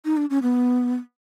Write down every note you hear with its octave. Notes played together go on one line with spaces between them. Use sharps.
D#4
D4
C#4
B3